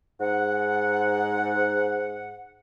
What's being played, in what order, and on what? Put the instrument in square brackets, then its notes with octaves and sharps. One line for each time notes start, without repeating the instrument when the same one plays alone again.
[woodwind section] G#2 F#5